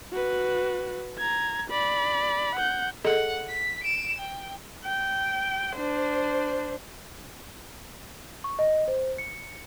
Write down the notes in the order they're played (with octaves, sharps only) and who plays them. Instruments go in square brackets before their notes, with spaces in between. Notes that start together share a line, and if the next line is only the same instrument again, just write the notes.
[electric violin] F#4 B4
A#5 G#6
D5 B5
F#5 G6
[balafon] G#4 A4 D#5 [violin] F#5
[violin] B6
D7 E7
G5
[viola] G5
D4 C5
[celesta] C#6
D#5
C5
C#7